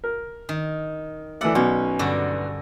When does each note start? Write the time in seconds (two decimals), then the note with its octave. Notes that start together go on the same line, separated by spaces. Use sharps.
0.04 A#4
0.49 D#3
1.41 E3 A3 D5 E5 F#5
1.55 B1 B2 C#4
1.99 G2 D3 F#4